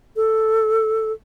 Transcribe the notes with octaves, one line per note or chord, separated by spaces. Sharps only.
A4